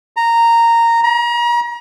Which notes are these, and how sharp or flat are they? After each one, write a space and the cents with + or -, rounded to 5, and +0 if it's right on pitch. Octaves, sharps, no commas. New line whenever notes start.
A#5 -10
A#5 +35